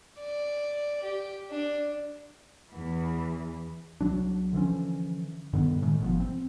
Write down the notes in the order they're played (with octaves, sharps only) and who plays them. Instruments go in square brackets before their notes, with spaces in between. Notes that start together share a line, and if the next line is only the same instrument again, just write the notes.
[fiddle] D5
G4
D4
[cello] E2 E3
[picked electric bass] B1 F#2 F#3 D4
D3 E3 F3 C#4
G2 D3 D#3 B3
A2 D#3 G#3
G1 B2 F3
C4